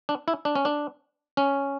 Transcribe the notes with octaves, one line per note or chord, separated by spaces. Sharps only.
D4
E4
D4
C#4
D4
C#4